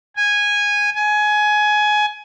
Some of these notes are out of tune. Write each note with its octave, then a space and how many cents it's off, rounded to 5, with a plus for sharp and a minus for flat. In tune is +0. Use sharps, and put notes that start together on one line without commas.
G#5 -10
G#5 +20